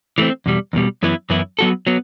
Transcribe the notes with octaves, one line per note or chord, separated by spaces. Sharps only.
E3 A3 C4
E2 B2 G3
E2 B2 G3
F#2 E3 B3 E4
F#2 E3 B3 E4
F#3 B3 F#4 A4
F#3 B3